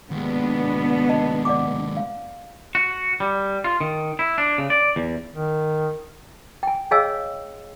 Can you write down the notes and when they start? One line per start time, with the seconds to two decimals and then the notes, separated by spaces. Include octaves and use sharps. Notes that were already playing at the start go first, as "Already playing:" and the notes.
0.11 D#2 B2 G#3 B3 D4
1.09 D#5 A5
1.45 D5 F#5 D6
1.97 F5
2.75 F#4
3.20 G3
3.64 F4
3.81 D#3
4.19 E4
4.38 D4
4.58 C#3
4.70 D5
4.96 E2
5.33 D#3
6.63 G5 G#5
6.91 G#4 C#5 D#5 F5 G#5 E6